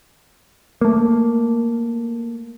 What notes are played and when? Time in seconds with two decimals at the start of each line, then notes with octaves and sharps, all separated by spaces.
0.81 A3 A#3